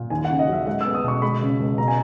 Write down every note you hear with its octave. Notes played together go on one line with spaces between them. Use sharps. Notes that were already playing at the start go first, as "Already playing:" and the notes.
Already playing: A#2
D#2 G#5
F#5
C#3
D#5
F#3 E5
G#3 F#5
E6
B3
D#6
B2 C#6
G#3 B5
C#3
C#2
B2 A#5
G#5